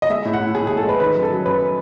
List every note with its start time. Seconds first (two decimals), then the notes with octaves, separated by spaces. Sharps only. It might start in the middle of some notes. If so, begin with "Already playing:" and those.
0.02 D#5
0.10 G#3 E5
0.25 A2
0.33 F#5
0.40 A2
0.55 A2 G#4
0.67 A2 G#4
0.77 A4
0.85 G#3 B4
1.00 D#3 B4
1.15 F#2
1.23 A4
1.30 F#3
1.46 F#2 B4